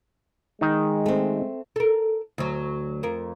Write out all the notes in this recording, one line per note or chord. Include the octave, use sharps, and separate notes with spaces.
D#3 G#3 D#4
A3 C4
A4 A#4
D2 F#3
F2 A#4